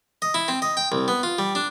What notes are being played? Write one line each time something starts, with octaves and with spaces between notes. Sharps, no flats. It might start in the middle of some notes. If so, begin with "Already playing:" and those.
D#5
E4
C4
D#5
G5
C2
B3
F4
G3
D4